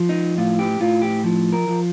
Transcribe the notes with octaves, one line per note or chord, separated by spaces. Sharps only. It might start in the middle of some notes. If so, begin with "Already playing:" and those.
Already playing: F3
D#4
A2 F4
G4
A2 F4
G4
F3
A#4
F3